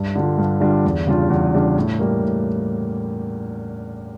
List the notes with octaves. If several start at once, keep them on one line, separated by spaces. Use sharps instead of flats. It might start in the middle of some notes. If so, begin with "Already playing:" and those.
Already playing: G2
D3 G3 D4 F4
G2
D3 G3 D4 F4
E2
C#3 G3 D4 F4
E2
C#3 G3 D4 F4
A2
G3 A#3
A2